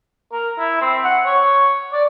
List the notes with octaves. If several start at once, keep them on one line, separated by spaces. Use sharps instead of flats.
A#4
E4
C4
F#5
C#5
D5